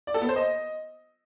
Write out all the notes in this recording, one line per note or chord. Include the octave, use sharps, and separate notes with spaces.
D5
A4
B3
C5
D#5